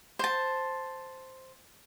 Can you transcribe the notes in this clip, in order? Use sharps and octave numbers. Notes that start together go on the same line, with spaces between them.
C5 A5